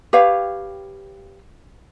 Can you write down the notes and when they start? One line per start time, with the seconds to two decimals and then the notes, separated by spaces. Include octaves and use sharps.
0.13 G4 B4 C#5 F5